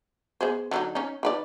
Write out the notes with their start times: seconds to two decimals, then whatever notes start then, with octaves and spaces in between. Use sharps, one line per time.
0.41 B3 G#4 C5
0.71 D3 F#3 D#4
0.95 C#4 D#4
1.23 D#3 B4 D5